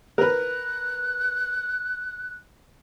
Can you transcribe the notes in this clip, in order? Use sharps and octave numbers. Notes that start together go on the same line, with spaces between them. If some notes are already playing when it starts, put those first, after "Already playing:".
A#4 B4 F#6